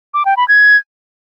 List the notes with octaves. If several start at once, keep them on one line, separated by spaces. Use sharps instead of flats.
D6
G5
B5
G#6